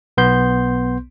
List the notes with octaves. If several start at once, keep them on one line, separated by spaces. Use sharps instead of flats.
B1 B3 C6 G6